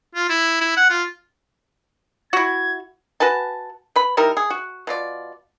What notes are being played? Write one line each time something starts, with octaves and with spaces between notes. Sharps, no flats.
F4
E4
E4
F#5
F4
E4 F#4 G#6
F#4 B4 G#5 A5
B4 B5
G3 D#4 E4 A#4
G#4
F#4
B2 F4 D5